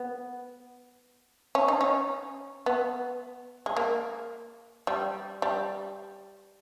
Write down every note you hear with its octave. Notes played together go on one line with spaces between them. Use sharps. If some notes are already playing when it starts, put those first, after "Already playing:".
Already playing: B3
C#4
D#4
C#4
B3
G#3
A#3
G3
G3